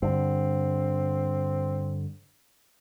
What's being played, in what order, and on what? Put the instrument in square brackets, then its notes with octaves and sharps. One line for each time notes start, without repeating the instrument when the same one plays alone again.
[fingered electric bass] G2 D3 [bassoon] C4